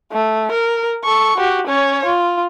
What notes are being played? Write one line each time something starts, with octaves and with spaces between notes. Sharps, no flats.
A3
A#4
A4 C#6
F#4 G4
C#4 C#5
F4